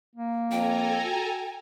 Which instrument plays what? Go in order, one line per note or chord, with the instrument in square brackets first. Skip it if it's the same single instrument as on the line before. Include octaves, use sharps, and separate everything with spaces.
[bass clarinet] A#3
[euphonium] F2 [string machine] A4 G#5 A#5 [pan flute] G5
[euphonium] F#4